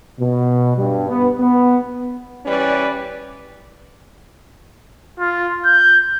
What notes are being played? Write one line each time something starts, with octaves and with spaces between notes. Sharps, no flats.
B2
G2
B3
B3
E3 G3 C#4 G4 B4 D5
F4
G6